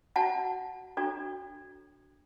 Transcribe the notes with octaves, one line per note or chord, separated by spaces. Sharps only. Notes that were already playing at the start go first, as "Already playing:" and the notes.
F#4 C#5 F#5 A5
D4 F#4 A4 C#5